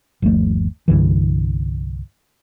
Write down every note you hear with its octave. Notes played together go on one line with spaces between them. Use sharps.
G1 D#2 F3 A3
C2 G2 D3 E3